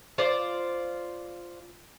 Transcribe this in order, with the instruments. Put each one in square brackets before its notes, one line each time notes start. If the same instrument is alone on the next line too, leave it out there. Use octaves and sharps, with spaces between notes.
[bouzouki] F4 C5 D5